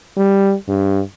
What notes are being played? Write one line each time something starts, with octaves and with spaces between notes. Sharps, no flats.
G3
G2